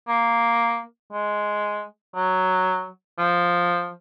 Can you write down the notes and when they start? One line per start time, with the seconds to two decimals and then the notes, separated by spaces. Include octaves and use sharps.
0.08 A#3
1.13 G#3
2.16 F#3
3.18 F3